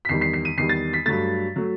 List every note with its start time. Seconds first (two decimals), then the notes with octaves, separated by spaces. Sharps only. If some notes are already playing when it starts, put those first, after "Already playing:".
0.05 B6
0.09 E2 D#3 G3 C7
0.21 C7
0.34 C7
0.45 D#7
0.57 E2 D#3 G3 C7
0.69 A6
0.93 B6
1.05 G2 F#3 A3 A6
1.56 F#3 A3